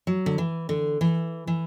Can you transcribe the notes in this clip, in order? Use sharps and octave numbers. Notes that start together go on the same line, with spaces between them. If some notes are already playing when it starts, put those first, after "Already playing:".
F#3
D3
E3
D3
E3
E3